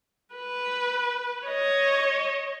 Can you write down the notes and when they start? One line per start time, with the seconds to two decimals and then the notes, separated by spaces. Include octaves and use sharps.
0.35 B4
1.47 C#5 D#5